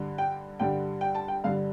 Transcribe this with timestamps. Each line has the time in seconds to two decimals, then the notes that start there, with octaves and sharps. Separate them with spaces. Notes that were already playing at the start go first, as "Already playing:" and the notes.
Already playing: G2 D3 G3
0.18 G5
0.60 G2 D3 G3 G5
1.01 G5
1.15 A5
1.28 G5
1.44 G2 D3 G3 F5